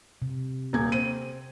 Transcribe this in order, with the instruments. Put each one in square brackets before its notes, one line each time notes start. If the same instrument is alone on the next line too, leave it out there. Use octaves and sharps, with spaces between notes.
[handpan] C3
[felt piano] D#1 G#6
C4 D#7